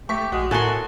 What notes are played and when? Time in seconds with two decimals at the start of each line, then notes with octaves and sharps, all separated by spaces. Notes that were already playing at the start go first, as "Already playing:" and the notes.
0.09 A3 G4 C#6 B6
0.32 A#1 G#3 F#4
0.51 A2 F#4 A4 A#4 G#5 C6 F#6